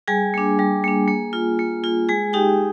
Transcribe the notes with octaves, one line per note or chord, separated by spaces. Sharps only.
G3 G#4 G#5
A#3 D4
G3
A#3 D4
A#3
F4
A#3
F4
G#3 G#4 G#5
D#4 G4 G5